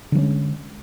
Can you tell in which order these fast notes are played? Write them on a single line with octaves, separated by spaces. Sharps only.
D3 F#3 C#4 G#3